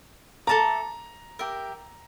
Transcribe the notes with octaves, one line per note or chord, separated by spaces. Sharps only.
A4 E5 A5 A#5 D6
G4 A#4 E5